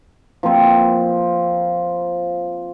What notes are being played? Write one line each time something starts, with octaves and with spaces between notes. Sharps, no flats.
F3 A#3 C4